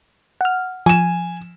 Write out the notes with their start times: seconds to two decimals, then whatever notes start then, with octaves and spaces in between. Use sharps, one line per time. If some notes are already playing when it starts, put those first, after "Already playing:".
0.41 F#5 F6
0.86 F3 G#5 E7